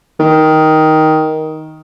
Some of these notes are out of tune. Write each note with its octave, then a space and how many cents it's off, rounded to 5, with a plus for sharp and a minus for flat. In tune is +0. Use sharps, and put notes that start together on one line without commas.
D#3 +10